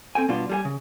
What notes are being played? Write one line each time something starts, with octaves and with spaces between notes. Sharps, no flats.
C4 A4 G5 G#5
G2 B2 D4 F4
G3 G#4 G#5
C#3